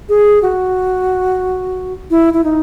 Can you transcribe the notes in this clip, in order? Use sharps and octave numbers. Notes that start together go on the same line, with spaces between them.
G#4
F#4
E4
E4
D#4